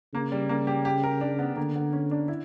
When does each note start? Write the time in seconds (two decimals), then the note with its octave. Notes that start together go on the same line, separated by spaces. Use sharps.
0.14 C#3 A#3
0.32 G3
0.49 A#3
0.67 G4
0.85 G4
1.04 A#4
1.21 D4
1.39 B3
1.57 D3 A#3
1.75 B3
1.93 C#4
2.11 D4
2.28 E4